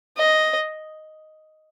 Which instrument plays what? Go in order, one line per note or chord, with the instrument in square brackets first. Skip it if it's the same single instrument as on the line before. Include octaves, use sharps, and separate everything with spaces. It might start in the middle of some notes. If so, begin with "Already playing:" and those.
[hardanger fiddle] D#5